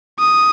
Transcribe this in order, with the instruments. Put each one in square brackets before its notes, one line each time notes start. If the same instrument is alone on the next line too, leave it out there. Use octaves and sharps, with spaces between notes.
[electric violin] D#6